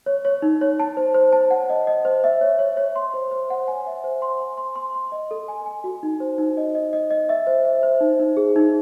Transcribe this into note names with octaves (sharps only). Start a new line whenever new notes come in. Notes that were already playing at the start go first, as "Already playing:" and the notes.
C#5
C#5
D#4
C#5
A5
C5
C5
A5
F#5
D#5
D#5
C5
E5
C#5
C#5
C#5
C6
C5
C5
F#5
G#5
E5
C5
C6
G#5
C6
C6
C6
D#5
A4
G#5
G#5
F#4
D#4
C5
D#4
D#5
D#5
D#5
D#5
E5
C5
E5
C5
D#4
D#4
G#4
D#4